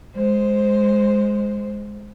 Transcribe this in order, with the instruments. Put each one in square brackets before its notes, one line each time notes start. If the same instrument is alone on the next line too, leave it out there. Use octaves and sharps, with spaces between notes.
[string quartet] G#3 C5